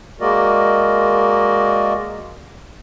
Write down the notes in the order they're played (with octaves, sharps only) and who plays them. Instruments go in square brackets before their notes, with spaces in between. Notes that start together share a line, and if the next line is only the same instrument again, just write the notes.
[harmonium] G#3 A#3 F#4 A#4 D5 D#5